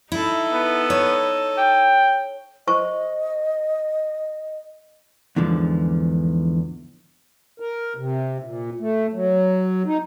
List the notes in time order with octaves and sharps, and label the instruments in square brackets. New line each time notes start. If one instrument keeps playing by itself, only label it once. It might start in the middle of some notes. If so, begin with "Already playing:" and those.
[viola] D#4 A4 [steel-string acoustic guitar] E4
[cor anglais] B3
[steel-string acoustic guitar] C#5
[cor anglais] G5
[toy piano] C5 C#6 [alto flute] D#5
[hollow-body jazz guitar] E2 G#2 D3 F3
[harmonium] A#4
C3
A#2
A3
F#3
D#4